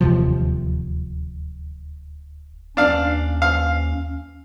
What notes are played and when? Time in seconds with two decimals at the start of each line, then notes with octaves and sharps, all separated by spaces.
0.01 D1 D#2 C3 F3
2.77 D#2 C#4 D4 F5
3.42 F5